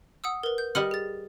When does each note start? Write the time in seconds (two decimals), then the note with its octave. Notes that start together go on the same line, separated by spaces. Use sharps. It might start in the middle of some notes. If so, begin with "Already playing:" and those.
0.24 F#5 D#6 E6
0.43 A#4 B4
0.58 G6
0.75 G3 D#5 F#5 F6
0.91 G#4 A6